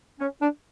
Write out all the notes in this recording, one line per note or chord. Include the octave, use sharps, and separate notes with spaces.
C#4
D4